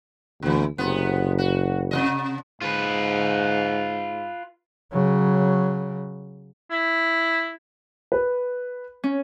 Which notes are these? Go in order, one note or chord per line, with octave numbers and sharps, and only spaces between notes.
D2 A#2 E3
F#1 C3 B3
F#4
C3 F#3 D#5
G#2 F4 B4
C#3 F#3
E4
B4
C#4